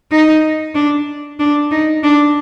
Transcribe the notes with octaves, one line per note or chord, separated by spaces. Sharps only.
D#4
D4
D4
D#4
D4